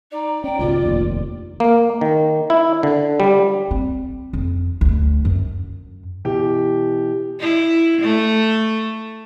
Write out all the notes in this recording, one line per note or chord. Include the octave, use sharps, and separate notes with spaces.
D#4 D5
C#4 G5
C#2 G#2 B2 F4
F1 A#1 D#2
A#3
D#3
E4
D3
G3
C4
F2
D2
F#2
B2 E3 G4
E4
A3